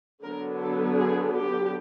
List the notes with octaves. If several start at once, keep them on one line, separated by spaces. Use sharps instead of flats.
D3 F#3 B3 D4 A#4
A4
G#4
G4